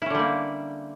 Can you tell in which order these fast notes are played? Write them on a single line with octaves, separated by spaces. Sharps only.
E4 C#4 D3 G3 A#3